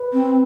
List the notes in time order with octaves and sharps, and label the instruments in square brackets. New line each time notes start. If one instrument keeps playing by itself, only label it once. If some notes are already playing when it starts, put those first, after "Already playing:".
Already playing: [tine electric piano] B4
[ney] C4